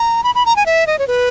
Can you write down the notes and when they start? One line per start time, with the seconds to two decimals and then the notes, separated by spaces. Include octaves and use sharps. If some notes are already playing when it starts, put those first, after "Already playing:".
Already playing: A#5
0.24 B5
0.35 B5
0.46 A#5
0.56 G#5
0.66 E5
0.87 D#5
0.99 C#5
1.07 B4